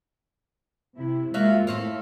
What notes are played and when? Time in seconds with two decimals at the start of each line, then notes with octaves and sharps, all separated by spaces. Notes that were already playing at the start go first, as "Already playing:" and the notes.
0.97 C3 E4
1.34 G#3 A#3 F4 F#4 E5 F5
1.67 A2 A3 C4 F5